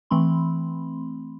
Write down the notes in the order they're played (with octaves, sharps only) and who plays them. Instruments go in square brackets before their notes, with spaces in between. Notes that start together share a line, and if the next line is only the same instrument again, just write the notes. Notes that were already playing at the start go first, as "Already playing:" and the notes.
[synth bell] E3 A3 C4 B5 C6